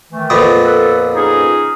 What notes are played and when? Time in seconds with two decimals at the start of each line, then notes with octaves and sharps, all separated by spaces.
0.11 D#3 E3 A3
0.30 F2 A#2 B3
0.62 A4 B4
1.14 C#4 D#4 G#4